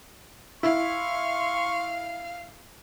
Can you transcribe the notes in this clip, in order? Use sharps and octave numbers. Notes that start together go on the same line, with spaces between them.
E4 F5 C6 C#6